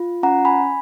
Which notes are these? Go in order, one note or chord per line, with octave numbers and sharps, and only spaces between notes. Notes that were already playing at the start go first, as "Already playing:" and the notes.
Already playing: F4
C#4 F#5 A#5
G#5 B5